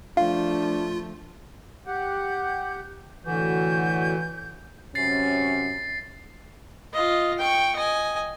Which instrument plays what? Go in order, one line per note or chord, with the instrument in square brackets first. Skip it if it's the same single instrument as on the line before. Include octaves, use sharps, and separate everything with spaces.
[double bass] F3 A3 [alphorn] D4 [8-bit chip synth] F4 [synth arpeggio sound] F5
[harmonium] G4 F#5 [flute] G6
[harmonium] A2 D3 F#4 [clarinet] E3 [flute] G6
[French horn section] F#2 C3 C#4 [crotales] A6 C7
[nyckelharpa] F4 D#5
G5 C#6
D#5 G#5